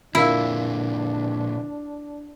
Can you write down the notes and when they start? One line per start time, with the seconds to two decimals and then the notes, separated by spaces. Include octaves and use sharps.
0.15 A#2 D3 D4 E4 F4 A#4 F5